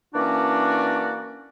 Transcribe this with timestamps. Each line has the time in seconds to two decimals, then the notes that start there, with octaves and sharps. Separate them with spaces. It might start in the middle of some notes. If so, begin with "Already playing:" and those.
0.14 E3 A#3 C#4 D4 F#4 D5